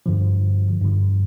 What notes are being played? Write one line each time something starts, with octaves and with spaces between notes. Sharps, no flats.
G2 D3 F3
G2 D3 F3